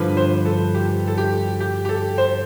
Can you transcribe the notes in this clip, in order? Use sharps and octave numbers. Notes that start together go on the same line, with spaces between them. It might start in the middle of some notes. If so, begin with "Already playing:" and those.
Already playing: G2 D3 F3 B4
C5
A4
G4
A4
G4
G4
G4
A4
C5